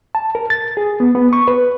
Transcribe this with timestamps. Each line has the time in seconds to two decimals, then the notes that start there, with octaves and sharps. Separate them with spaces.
0.15 A5
0.35 A#4
0.50 A6
0.77 G#4
1.00 B3
1.15 B3
1.33 C#6
1.48 B4